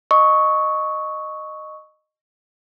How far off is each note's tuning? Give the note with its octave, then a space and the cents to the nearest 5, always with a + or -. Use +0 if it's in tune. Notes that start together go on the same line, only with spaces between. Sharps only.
D#5 -15 C#6 +0 E6 -45